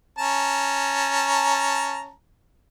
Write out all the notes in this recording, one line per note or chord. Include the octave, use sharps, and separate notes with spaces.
C#4 A5 A#5